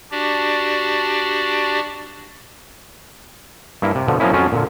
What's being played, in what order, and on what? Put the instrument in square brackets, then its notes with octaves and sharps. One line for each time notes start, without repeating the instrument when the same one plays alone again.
[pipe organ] D4 F#4 G4 D5
[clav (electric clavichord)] G2 A#3 E4
C3
B2 D3 F3
F3 F#3 A#3 B3 C#4 E4
F2 F3 F#3 C#4 F4
A#2 D3